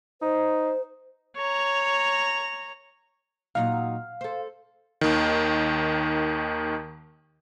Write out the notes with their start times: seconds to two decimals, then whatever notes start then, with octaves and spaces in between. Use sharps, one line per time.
0.22 D#4 C5
1.37 C#5 A#5
3.55 A#2 F#3 D#4 F5
4.21 A4 C5
5.01 D#2 D#3